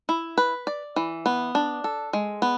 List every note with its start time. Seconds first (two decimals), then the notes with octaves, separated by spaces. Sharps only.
0.09 E4
0.38 B4
0.67 D5
0.96 E3
1.26 B3
1.55 D4
1.84 A4
2.13 G#3
2.42 B3